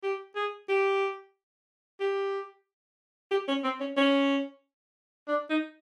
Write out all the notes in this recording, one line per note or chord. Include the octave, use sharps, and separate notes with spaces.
G4
G#4
G4
G4
G4
C#4
C4
C#4
C#4
D4
D#4